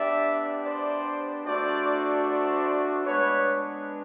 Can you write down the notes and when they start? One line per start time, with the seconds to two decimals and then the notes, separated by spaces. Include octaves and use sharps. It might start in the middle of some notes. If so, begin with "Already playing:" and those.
Already playing: B3 D4 G4 D5 E5
0.64 C5 D5
1.45 A3 D4 F#4 C5 D5
2.25 C5 D5
3.06 G#3 B3 D4 B4 C#5